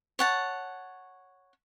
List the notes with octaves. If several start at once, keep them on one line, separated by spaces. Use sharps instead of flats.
C#5 F#5 A5